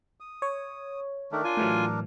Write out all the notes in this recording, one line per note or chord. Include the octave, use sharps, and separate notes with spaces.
D#6
C#5
D#3 A3 D4 A#4
F4 G#5
A2 E3 F#3